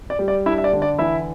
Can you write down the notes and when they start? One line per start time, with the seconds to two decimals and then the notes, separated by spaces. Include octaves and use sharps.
0.10 D5
0.19 G3
0.28 D5
0.46 D4 E4 E5
0.58 E5
0.64 D5
0.73 D3
0.82 D5
0.98 E3 E4 E5